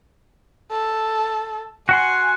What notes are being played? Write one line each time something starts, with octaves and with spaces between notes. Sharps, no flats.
A4
F#4 F#5 G#5 C6